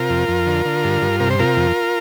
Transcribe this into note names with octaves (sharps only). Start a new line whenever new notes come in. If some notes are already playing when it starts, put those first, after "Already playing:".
Already playing: C3 F4 A#4
F2
F2
D3
D3
G2
G2
C3 A#4
C5
C3 F4 A#4
F2